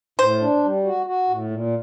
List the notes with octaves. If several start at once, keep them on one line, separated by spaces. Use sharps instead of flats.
A2 C5
D4
G3
F#4
F#4
A2
A#2